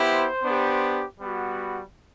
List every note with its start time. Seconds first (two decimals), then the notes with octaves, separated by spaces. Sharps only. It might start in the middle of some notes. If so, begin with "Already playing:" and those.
Already playing: B3 E4 G4 C5
0.43 B3 D4 G4
1.20 G3 B3 F#4